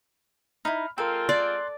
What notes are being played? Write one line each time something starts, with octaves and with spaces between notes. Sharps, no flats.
D#4 E4 B5 F6
G#3 C4 F4 A4 A#4 G5
D5 C6 F#6 A6